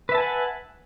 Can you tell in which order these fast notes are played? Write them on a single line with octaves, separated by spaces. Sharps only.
B4 E5 A5 G#5 F#5